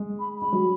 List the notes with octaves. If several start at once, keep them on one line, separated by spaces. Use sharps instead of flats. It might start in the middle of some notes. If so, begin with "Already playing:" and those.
Already playing: G#3
B5
G#3 B5
F#3